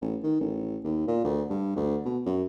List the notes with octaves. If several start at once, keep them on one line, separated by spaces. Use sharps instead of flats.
A1
D#3
A1
D#2
A#2
D2
G2
D2
B2
F#2